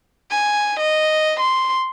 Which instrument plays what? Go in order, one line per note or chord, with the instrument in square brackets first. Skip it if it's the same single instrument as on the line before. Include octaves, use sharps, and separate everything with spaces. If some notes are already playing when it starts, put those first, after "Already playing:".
[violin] G#5
D#5
C6